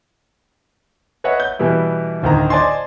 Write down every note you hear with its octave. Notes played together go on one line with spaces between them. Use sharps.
B4 C#5 D#5 E5 F#5
G6
B2 E3 G3 E4
D1 D2 D#3 A#5
C5 D5 D#5 G#5 A5 C6